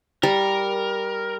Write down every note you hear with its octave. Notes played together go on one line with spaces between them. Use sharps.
G3 A#4